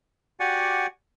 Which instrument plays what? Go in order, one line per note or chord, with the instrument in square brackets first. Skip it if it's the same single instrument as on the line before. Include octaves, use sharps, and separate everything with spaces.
[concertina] F#4 G4 D5 F#5 G#5